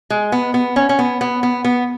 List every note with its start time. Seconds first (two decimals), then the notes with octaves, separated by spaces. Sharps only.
0.10 G#3
0.32 B3
0.54 B3
0.76 C#4
0.89 C#4
0.99 B3
1.21 B3
1.43 B3
1.65 B3